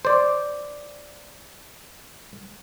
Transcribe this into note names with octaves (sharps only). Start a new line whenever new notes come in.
C5 D5